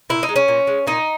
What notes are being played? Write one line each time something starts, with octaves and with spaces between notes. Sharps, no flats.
A#2 E4
D#4
G#3
C#4
A#2
G#3
A#2 D#4